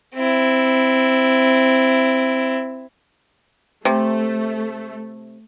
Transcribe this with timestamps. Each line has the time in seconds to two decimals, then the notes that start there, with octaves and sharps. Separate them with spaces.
0.14 C4 E4
3.85 C3 A3